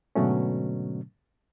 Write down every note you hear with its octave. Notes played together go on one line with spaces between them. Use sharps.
G#2 B2 D3 F#3 A3 C#4